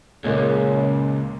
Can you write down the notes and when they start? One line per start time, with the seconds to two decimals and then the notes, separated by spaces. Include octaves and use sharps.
0.24 C#2 A#2 C#3 G#3 A#3